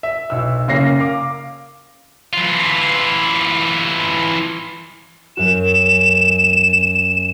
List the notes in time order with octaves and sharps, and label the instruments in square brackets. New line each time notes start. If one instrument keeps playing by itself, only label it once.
[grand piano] E5
B1 E6
F#1 A#3 C#4 A#6 C7
F5 D6
[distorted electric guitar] E3 F4
[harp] F#2 F#4 [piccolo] E7